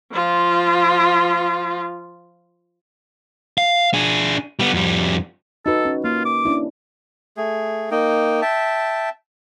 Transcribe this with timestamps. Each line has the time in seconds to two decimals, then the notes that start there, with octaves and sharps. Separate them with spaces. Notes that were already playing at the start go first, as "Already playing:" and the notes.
0.13 F3 F4
3.58 F5
3.94 D4 G#4
4.59 G3 B3
4.74 F2 G3
5.66 D#4 F#4 A4 B4
5.85 C#4
6.04 A#3 F4
6.25 D6
6.45 C#4 D4 E4
7.37 A3 G#4
7.91 A#3 D#4 G5
8.42 E5 G5 A5